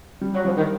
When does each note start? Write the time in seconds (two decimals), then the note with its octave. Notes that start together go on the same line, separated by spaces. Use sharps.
0.21 G3
0.33 F#3
0.45 F3 G3
0.57 D#3